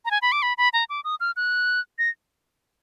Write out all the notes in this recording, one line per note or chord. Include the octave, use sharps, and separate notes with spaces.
A#5
G#5
B5
D6
B5
B5
A#5
D6
D#6
F6
F#6
A#6